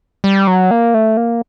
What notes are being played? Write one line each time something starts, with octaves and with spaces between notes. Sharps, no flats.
G3
F#3
A#3
A3
A#3